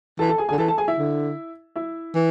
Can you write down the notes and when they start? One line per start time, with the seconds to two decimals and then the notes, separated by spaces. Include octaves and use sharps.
0.19 E3 A4 A5
0.29 A4 A5
0.38 G#4 G#5
0.49 G#4 G#5
0.52 D3
0.58 E3 A4 A5
0.68 A4 A5
0.78 G#4 G#5
0.88 E4 E5
0.98 D3
1.76 E4 E5
2.15 E3